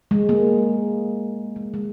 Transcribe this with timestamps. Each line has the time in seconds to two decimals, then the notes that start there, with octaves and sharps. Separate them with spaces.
0.11 G#3
0.29 A#3
1.56 G#3
1.74 G#3